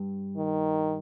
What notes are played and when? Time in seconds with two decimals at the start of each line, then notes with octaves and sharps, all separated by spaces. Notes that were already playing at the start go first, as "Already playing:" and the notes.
Already playing: G2
0.37 D#3